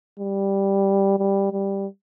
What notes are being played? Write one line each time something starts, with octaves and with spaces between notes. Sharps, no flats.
G3
G3
G3